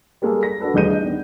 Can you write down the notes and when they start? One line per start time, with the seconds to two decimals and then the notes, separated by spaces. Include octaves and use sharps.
0.22 G3 G#3 A#3 G#4 A4
0.43 A#6
0.60 D4 F#4 A4 B4
0.74 D#1 A1 G#4 G6 D#7
0.90 D4 D#5
1.02 D#3 B3